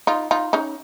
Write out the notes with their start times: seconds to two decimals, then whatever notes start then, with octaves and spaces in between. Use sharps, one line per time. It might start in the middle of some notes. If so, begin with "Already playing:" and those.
0.07 D#4 F4
0.31 D#4 F4
0.53 C#4 D#4